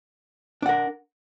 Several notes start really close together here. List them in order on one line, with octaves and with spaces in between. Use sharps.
D4 F#5 A#4